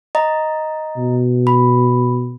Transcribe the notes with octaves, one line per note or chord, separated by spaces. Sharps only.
D#5 A#5
B2
B5